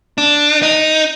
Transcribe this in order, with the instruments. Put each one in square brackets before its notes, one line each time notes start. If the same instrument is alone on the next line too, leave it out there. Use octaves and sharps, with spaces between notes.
[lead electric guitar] D4
D#4